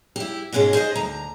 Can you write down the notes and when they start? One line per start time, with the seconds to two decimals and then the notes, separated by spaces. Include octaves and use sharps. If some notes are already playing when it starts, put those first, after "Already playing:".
0.16 E4 G4
0.52 G#2 B2 G#3 C#4 G#4
0.73 G#4 C5 C#5 D#5
0.95 D2 A#5